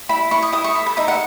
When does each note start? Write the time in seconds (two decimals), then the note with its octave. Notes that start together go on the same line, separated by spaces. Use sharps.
0.09 E4 B5
0.31 E4 C#6
0.42 D#6
0.53 E4 D#6
0.64 C#6
0.74 A4 B5
0.86 B5
0.97 D#4 E5
1.08 F#5